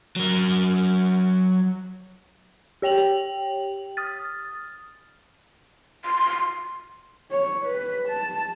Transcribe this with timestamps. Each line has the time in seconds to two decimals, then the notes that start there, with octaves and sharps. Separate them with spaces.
0.16 F#3 A#4
2.82 G4 C#5 G5 F7 F#7
3.97 D#6 F6 A6
6.05 C6
7.31 C#5
7.66 B4
8.08 A5